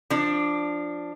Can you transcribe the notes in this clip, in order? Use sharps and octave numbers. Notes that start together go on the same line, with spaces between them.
F3 D4